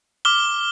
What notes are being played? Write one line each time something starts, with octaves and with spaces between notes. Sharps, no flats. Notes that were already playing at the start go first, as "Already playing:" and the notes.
D6 F6 G7